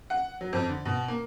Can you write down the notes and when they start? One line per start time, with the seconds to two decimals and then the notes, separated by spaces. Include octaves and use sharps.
0.10 F#5
0.41 F#3
0.53 F2
0.69 D3
0.85 B2
1.08 A#3